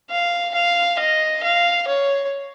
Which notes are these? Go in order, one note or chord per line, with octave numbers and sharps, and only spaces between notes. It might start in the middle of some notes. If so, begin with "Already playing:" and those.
F5
F5
D#5
F5
C#5